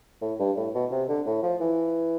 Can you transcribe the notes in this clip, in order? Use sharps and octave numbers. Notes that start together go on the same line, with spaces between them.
A2
G2
A2
B2
C3
D3
A2
F3
E3